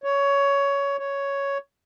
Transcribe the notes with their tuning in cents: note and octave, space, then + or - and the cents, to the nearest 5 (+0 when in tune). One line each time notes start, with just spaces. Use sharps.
C#5 +15
C#5 +5